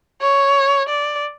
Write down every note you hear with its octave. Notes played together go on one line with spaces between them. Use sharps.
C#5
D5